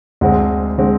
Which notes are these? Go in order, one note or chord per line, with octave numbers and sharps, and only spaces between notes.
D2 D3 G#3 C4
D3 G#3 C4